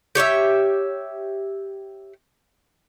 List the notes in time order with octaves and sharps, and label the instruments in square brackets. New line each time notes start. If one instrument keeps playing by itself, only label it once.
[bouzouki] G4 C#5 D5 E5